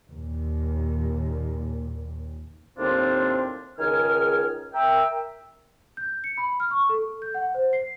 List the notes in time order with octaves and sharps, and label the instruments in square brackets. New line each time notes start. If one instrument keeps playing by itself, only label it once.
[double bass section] D#2 A#2
[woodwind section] D#2 A2 C4 D4 F4 C5
C#2 D#3 G#4 G#5 F6
A#4 E5 G5
[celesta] G6
C#7
B5
F6
C#6
A4
G6
F#5
C5
C7